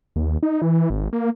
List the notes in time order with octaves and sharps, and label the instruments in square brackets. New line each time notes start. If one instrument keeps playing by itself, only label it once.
[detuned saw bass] D#2
D#4
E3
G#1
A#3